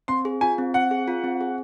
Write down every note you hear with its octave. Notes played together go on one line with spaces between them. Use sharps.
C4 C6
G#4
F4 G#5
C4
C4 F#5
G#4
F4
C4
G#4